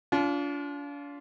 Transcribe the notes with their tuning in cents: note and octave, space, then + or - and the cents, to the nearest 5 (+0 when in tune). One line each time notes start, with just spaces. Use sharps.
D4 -40 F4 +0